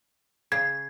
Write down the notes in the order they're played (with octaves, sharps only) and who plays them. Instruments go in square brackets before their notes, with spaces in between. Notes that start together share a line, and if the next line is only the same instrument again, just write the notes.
[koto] C#3 [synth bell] G#6